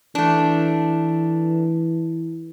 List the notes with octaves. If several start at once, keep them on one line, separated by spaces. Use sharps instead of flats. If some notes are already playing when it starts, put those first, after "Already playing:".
E3 A3 D4